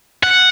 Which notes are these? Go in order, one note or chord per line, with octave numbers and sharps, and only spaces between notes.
F#5